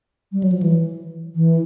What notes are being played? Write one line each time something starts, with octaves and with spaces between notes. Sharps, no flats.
G3
F#3
F3
E3
E3